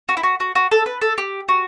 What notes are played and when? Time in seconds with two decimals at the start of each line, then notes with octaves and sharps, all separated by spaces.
0.09 F#4
0.17 E4
0.23 F#4
0.40 F#4
0.55 F#4
0.71 A4
0.86 B4
1.01 A4
1.18 G4
1.49 F#4